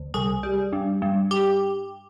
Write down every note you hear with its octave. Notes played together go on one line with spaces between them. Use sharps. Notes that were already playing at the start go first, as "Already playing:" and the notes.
Already playing: D2
C2 G#4
G3
G2
G2
G4